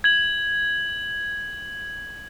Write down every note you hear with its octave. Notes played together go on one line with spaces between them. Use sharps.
G#6 F#7